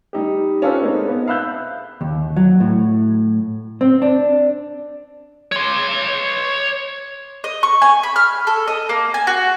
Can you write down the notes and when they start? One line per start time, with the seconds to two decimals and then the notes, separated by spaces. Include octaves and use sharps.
0.13 G3 D#4 G4
0.62 C#4 D4 F4 A4 B4 C5
0.82 G#3 A#3 C4 D#4
1.08 B3
1.27 E5 F5 B5 E6 F#6 G6
2.01 D#2
2.36 F#3
2.60 A2
3.81 C4
4.02 D4
5.52 C#5 C6
7.44 D#5
7.63 C#6
7.82 G#5
8.03 B5
8.16 F6
8.47 A4
8.67 D#5
8.89 A#3
9.14 G#5
9.27 F#4